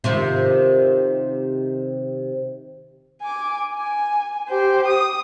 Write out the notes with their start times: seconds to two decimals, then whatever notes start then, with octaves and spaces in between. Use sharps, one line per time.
0.04 C3 D#3 F4
3.21 G#5 D6
3.74 G#5
4.50 G4 C5
4.88 D#6